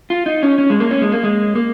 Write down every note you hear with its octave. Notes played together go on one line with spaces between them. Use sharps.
F4
D#4
C#4
C#4
G#3
A#3
C#4
G#3
A#3
G#3
A#3